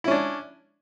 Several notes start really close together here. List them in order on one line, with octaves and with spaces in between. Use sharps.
E4 C#4 D4